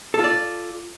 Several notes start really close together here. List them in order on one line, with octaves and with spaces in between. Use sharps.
A4 F4 D5